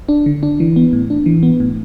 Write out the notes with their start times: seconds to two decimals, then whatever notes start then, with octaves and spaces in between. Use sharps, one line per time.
0.09 D4
0.26 D3
0.43 D4
0.60 E3
0.76 B3
0.93 A2
1.10 D4
1.26 E3
1.43 B3
1.60 A2